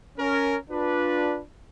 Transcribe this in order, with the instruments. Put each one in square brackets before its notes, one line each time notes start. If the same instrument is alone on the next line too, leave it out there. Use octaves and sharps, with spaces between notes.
[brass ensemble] C#4 A#4
D4 F4 B4